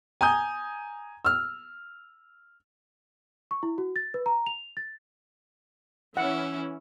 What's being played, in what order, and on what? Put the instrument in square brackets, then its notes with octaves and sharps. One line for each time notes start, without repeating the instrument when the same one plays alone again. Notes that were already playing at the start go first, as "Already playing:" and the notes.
[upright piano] G#5 A#5 D#6 G6
E6 F6
[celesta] C#6
E4
F#4
A6
B4
A#5
F7
A6
[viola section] E3 C#4 [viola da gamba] E4 [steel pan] F#5